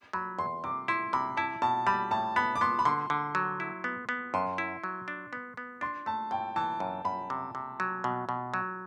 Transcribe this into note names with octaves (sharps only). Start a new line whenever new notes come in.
F#3 B5
E2 C6
C3 D6
E4 C6
C3 B5
E4 A5
B2 A5
G3 B5
A2 A5
B3 B5
D6
B3 C6
B5
D3 C6
D3
F#3
E4
B3
B3
F#2 C6
E4
F#3
D4
B3
B3
D4 C6
A3 A5
A2 G5
E3 A5
F#2
F#2 B5
C3
C3
F#3
B2
B2
F#3